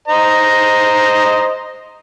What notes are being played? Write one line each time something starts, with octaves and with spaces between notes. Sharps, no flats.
C5 D#5 A#5